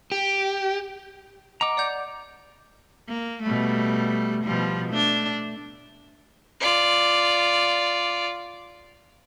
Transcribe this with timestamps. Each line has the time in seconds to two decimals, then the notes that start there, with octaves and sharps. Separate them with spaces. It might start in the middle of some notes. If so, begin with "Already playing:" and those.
0.12 G4
1.61 D#5 F#5 A#5 D6
1.77 D5 F#5 G6
3.09 A#3
3.42 B2 G3 A3
4.44 B2 F3 G3
4.89 A3 D4
6.60 F4 D5